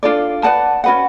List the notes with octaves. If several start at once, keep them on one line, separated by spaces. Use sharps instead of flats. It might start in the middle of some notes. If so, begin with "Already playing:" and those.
D4 F4 A4 D5
B4 D5 F#5 A5
C#4 F#4 B4 F#5